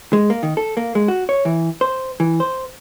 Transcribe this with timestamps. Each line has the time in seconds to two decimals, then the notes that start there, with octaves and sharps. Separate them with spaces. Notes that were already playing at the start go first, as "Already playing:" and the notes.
0.13 G#3
0.30 A#3
0.43 D#3
0.57 A4
0.77 A#3
0.95 G#3
1.08 F#4
1.29 C#5
1.45 E3
1.81 C5
2.20 E3
2.40 C5